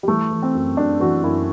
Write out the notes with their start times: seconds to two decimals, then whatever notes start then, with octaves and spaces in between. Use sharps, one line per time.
0.03 G3
0.08 E3 A3
0.31 E3
0.43 C4
0.55 F#2
0.77 F#2 D4
1.00 E3 F#4
1.23 F#2 E4